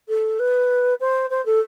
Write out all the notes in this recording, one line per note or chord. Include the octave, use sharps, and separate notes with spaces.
A4
B4
C5
C5
A4